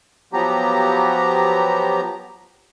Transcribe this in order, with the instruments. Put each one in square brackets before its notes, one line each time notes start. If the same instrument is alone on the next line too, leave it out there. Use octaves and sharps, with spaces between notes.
[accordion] F3 F#3 B3 G4 A#5